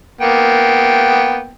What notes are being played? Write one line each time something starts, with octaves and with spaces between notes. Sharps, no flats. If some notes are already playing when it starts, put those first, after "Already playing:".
A#3 B3 G5